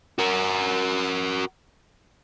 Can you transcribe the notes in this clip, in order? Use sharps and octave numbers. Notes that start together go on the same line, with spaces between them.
F#4 A#4